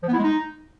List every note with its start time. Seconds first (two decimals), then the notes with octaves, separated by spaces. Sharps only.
0.03 F3
0.08 B3
0.13 E4
0.18 G#3
0.23 D#4